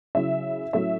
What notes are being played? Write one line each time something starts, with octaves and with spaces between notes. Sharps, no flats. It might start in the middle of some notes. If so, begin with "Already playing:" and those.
C#3 F#3 C#4 E4 E5
A2 F#3 A3 C#4 E5